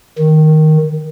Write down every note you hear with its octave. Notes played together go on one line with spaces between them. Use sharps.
D#3